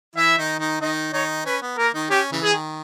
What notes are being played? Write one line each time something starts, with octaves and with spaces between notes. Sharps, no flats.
E3 E4 E5
D#3 D#4
D#3 D#4
D#3 D#4 D#5
D#3 D#4 C#5
C#4 B4
B3
A#3 A#4
D#3 D#4
C#4 G4
C#3 E3
G#4
D#3